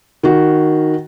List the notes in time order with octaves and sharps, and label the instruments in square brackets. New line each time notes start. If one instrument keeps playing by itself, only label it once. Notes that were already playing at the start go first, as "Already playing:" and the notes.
[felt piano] D#3 F#4